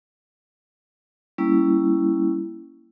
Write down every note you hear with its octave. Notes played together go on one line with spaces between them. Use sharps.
G3 A#3 C#4 E4